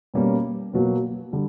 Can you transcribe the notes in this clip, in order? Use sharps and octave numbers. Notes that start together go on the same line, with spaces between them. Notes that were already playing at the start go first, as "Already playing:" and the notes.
B2 G3 A#3 C#4
B2 F#3 A#3
D3 G3